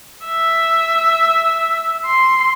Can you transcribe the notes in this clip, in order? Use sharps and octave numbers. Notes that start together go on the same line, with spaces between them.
E5
C6